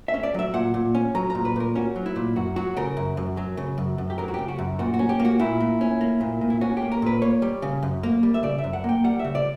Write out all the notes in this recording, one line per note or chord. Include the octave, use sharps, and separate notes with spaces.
E5
C#4
D5
F#3 E5
A#2 F#5
A#2
C#4
F#3 A#5
A#2 A#5
B4
A#2 A#4
C#4 F#4
F#3
E4
A#2
F#2 F#4
F#3 F#4
C#3 A#4
F#2
F#2
F#3
C#3
F#2
F#2
G4
F#3 A#4
F#4
C#3 G4
F#4
F#2
A#2 F#4
F#4
C#4
G4
A#3
F#4
A#2 E4
A#2
C#4
A#3
A#2
A#2
E4
C#4 F#4
G4
A#3
A#4
A#2 B4
A#3 C#5
G3
C#3
F#2
A#3
G3
E5
C#3 D5
E5
F#2
F#5
A#3 G5
G3 F#5
E5
C#3
D5